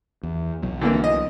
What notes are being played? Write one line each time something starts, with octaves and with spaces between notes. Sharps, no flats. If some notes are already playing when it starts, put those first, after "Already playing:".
E2
B1 F#3
D3 E3 A#3
D#5